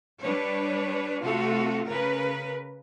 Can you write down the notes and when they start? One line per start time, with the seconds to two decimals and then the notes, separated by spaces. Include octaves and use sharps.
0.22 G3 D4 B4 C#5
1.21 C3 A3 F4 F#4 A4
1.86 C#3 A#4 B4